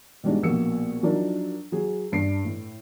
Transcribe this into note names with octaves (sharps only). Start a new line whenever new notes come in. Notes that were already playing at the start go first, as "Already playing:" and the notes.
B2 G3 G#3 D4 D#4
A#1 B2 A#3 E6 C#7
F3 F#3 D4 D#4 A#4
F#3 G#4
G2 D4 C7 D7
A2